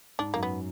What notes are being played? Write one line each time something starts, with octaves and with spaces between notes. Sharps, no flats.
G#2 D4
F#2 A#3
B3